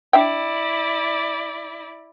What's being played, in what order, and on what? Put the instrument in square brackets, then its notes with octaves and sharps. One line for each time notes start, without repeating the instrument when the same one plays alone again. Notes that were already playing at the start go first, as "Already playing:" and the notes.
[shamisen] D4 E5 G5 [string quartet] E4 D5